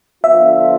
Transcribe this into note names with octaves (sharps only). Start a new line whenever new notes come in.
D3 F3 B3 F4 E5